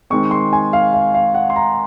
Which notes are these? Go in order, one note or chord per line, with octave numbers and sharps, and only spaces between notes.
D#3 G#3 C4 C#6
C6
G#5
F5
F5
F5
F#5
C6
A#5